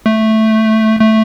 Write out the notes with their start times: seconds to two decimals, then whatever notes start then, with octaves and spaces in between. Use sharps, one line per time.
0.06 A3
1.00 A3